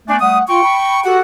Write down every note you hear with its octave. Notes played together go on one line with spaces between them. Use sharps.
A3 B3 D4 G#5
G3 A3 F#5 D#6
F4 G5 C#6
B5
F#4 G4 A4 F#5